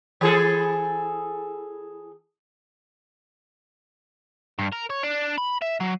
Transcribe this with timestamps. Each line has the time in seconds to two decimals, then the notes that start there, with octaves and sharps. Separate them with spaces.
0.21 E3 G#4 A4
4.59 G2
4.72 A#4
4.90 C#5
5.03 D4
5.38 B5
5.62 E5
5.80 F#3